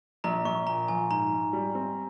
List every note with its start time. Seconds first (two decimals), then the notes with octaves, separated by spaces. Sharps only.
0.24 A#1 A#5
0.45 A#1 C#6
0.67 A#2 A#5
0.88 F3 G#5
1.11 G#2 A#5
1.32 G#2
1.53 G3
1.75 C4